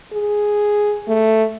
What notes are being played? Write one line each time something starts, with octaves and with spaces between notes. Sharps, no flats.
G#4
A3